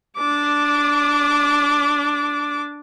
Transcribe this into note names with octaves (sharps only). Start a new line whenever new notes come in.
D4 D6